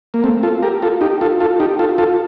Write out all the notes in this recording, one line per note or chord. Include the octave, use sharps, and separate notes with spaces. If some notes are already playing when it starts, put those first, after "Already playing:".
A#3
A3 C4
F4 A4
G4 A#4
F4 A4
D#4 G4
F4 A4
F4 A4
D#4 G4
F4 A4
F4 A4